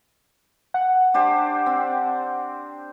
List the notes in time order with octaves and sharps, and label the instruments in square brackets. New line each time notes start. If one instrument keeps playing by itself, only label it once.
[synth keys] F#5
[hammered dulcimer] D4 G4 C5
C4